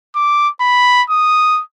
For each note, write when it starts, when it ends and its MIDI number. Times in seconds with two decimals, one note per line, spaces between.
0.15 0.49 86
0.60 1.03 83
1.10 1.61 87